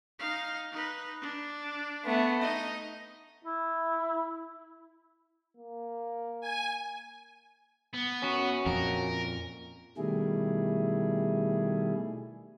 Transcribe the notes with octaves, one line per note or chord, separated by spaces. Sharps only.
D#4 F5
D#4 B4
D4
A3 B3
D#4 D#5
E4
A#3
G#5
B3
C#4 F#4
F2 A#2 A#4
B2 D#3 G3 A3 E4 G#4